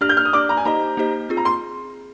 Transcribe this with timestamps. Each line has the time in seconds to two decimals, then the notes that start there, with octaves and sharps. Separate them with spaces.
0.01 D4 G4 D5 F6
0.09 G6
0.17 F6
0.25 D#6
0.33 D4 G4 D5 D6
0.49 A#5
0.57 G#5
0.65 A#3 D#4 G4 C5 D#5 A#5
0.97 A#3 D#4 G4 C5 D#5
1.29 C4 F4 G#4
1.37 A#5
1.45 C6